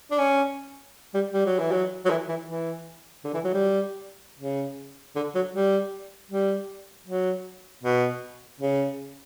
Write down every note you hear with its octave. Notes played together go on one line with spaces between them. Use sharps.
D4
C#4
G3
G3
F#3
E3
F#3
F#3
E3
E3
E3
D3
E3
F#3
G3
C#3
D3
F#3
G3
G3
F#3
B2
C#3